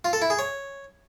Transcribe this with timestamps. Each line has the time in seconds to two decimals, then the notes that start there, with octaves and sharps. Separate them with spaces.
0.05 F4
0.13 A4
0.22 E4
0.30 G#4
0.39 C#5